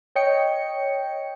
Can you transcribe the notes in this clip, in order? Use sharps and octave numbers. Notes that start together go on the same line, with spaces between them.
C#5 D#5 G5 C#7